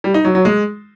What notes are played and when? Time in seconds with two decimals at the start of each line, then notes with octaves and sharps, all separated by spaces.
0.04 G3
0.14 D#4
0.25 F#3
0.35 F#3
0.45 G#3